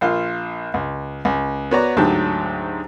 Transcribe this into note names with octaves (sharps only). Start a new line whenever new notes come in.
A#1 F4
C#2
C#2
B3 F#4 C#5 D5 A#5
D2 G#2 F#3 G4 A5